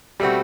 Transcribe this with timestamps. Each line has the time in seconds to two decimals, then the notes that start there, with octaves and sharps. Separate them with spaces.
0.20 B2 G3 A3 C4 F#4